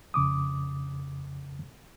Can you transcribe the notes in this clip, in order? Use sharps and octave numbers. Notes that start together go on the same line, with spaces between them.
F2 C#3 D6 D#6